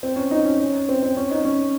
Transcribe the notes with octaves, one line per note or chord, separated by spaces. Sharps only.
C4
C#4
D#4
C#4
C#4
C4
C4
C#4
D#4
C#4